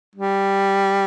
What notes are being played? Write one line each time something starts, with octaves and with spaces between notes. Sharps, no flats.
G3